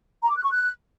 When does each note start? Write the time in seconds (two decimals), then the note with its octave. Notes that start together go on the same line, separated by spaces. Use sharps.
0.23 A#5
0.30 D6
0.37 F#6
0.44 C#6
0.51 F#6